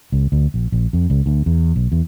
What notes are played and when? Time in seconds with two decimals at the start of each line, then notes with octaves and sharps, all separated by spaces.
0.12 C#2
0.32 D2
0.54 A#1
0.72 A#1
0.93 F2
1.10 C#2
1.26 D2
1.46 E2
1.76 B1
1.92 E2